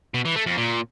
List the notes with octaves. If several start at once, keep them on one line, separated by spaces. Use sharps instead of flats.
B2
E3
A3
F2
A#2